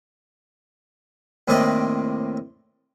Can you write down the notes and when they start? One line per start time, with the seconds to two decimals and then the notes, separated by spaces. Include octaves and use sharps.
1.48 D#2 A2 C3 C4 D5 D#5